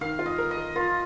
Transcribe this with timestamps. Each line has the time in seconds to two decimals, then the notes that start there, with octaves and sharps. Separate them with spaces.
0.01 D#3 F5
0.19 F4
0.26 D#5
0.38 A#4
0.51 D#5
0.57 A#4
0.75 F4 A#4